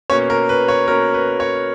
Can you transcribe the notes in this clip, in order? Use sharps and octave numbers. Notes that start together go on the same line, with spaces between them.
B2 A#3 C#4 C#5
A#4
B4
C#5
B2 A#3 C#4 A#4
B4
C#5